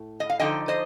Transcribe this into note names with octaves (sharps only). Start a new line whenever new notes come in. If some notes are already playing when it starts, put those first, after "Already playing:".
Already playing: A2
D#5
F5
D3 F3 C4 D#4 D#5 G5
C5 D#5